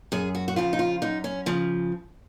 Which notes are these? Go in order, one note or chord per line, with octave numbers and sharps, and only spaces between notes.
F#2 G#4
F#4
F#4
C#3 F3 F4
D#4
F4
F#2 D#4
C#4
C#3 F3